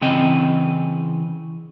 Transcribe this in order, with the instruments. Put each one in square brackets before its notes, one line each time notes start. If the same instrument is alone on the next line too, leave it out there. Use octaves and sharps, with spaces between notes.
[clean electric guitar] C#3 E3 C4 D#5 G5